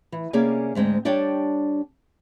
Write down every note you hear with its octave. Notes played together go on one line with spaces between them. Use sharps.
E3
C3 A#3 C#4 G#4 D5 G#5
D2 G#2 G#3 C4
G3 D4 G4 C#5 G5 A5